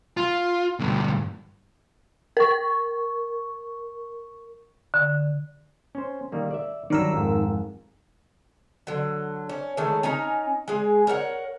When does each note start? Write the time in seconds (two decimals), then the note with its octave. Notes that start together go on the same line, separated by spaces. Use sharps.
0.17 F4
0.79 D2 G2
2.37 A#4 C#6
4.94 D3
5.95 C#4 C5
6.32 D#3 G3 A#3
6.51 D5 E5
6.90 G2 D#3 F#3 A#4 D5 E6
7.13 F2 G#2
8.87 D3 F#3
9.49 C#4
9.77 D#3 G#3 A3 C#4
10.03 C#4 D#4 G#5 A#5
10.68 G#3 G#4
11.07 A#4 C#5 E5 F#5